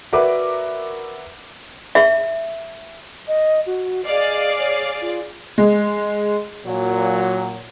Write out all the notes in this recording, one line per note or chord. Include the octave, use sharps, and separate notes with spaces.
F#4 A#4 B4 D5 E5 D6
E5
D#5
F#4
G#4 D5 D#5 F5
C#5
F4
G#3
A#2 F#3